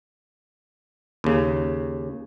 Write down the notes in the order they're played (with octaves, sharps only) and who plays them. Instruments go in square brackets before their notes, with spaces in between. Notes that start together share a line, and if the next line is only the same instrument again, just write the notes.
[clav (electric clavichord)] D#2 C#3